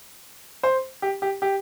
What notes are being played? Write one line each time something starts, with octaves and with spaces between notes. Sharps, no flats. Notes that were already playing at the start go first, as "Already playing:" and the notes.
C5
G4
G4
G4